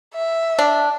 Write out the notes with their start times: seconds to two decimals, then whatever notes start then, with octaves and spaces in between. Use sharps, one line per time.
0.14 E5
0.59 D4